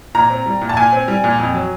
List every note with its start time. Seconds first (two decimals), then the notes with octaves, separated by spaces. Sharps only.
0.15 A#2 A#5
0.30 C4
0.46 G3
0.61 A#2
0.69 A5
0.77 A#2 G#5
0.93 C4
1.08 G3
1.24 A#2
1.38 F2
1.54 F#3